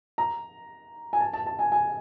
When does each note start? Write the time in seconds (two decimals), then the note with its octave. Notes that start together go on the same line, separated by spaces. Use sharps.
0.18 A#5
1.13 G#5
1.20 A5
1.33 A5
1.46 A5
1.59 G#5
1.72 G#5